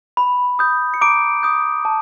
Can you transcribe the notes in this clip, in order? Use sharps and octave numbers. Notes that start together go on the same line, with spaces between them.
B5
D#6 G6
C#7
A#5 D6 D7
D#6 G6
A5